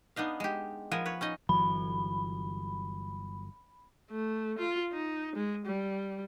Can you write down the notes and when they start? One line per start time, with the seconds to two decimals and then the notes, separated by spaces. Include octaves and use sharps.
0.16 B3 D4 D#4 F5
0.40 G#3 G4
0.91 F3 B3 A#4 G#5
1.06 B4 C#5
1.21 C#4 D#4 D#5
1.49 G1 E3 F#3 B5
4.10 A3
4.58 F4
4.92 D#4
5.35 G#3
5.66 G3